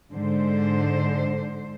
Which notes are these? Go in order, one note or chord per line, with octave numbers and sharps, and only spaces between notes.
G#2 D3 C5